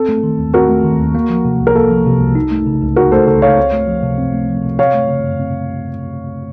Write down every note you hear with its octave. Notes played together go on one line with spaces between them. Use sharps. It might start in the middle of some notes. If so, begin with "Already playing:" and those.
Already playing: C4 A4
A3
D#3
D#2
C4 F#4 A#4
A3
D#3
D#2
A#3
F3
C3
C2
A#4
A#3 A4
F3
C3
C2
D#4
A3
C#3
C#2
D#4 F#4 A#4
A3 A4 C5
C#3 A4
C#2 C#5 F5
C4
A3
F3
C3
C4
A3
F3
C3
C4 C#5 F5
A3
C#3
F#2
C4